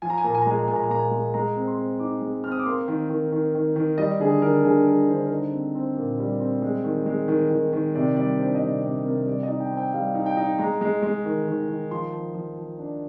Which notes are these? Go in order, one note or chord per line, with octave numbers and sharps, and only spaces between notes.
F3 G#5
A#5
G#5
A#2 A#5
G#5
A#5
G#3 G#5
A#5
A#2 G#5
A#5
G#5
A#2 A#5
G#5
G#3
G#3 A#5
C4
C6
C4
D#4 D6
G#3
C4 F6
D#6
D6
A#3 C6
D#3
D#3
D#3
D#3
D#3
G3 D#5
D3 G#4
D3 A#4
D3 G#4
G3 A#4
D3 C5
A#4
D#4 C5
C4
C4
A#2
G3
C4
G#3
D#3
G#3
D#3
D#3
D#3
C3 D5
G3 D5
D4 C5
D#5
C3 D5
C3 D5
C3 A#4
G3 D5
D#5
D#4
G5
C4
G5
G3 F5
D#4
G5
D#4
G#3 A#5
G#3
G#3
D#3
D#3
D#3
F3 C6
F3
F3
F3
D4